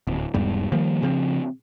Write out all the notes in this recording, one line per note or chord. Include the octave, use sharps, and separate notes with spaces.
D1
E1 E2 G#2 G3
D#3 F3 G3 A#3
C#3 F3 C4